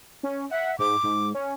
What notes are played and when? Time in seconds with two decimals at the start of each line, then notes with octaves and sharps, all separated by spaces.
0.23 C#4
0.51 E5 F#5
0.79 G#2 D6
1.03 G#2
1.35 C#4